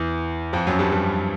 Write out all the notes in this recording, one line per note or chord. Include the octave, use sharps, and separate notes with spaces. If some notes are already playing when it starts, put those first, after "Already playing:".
Already playing: E2 E3
F2 F3
F#2 F#3
G2 G3
G2 G3